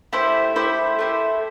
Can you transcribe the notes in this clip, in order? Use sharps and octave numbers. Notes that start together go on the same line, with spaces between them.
A3 E4 G4 C5
A3 E4 G4 C5
A3 E4 G4 C5